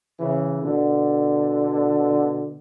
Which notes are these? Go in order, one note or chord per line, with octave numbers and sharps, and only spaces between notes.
C#3 E3
B2 D3